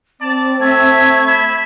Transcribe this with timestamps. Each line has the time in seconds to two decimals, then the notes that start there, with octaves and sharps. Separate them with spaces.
0.21 C4 D5 A5
0.61 A3 E5 G#6
1.27 E5 B5